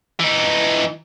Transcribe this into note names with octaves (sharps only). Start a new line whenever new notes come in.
E3 D#4